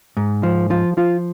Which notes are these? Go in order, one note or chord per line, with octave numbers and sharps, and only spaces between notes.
G#2
F3
F3 F4
F3 F4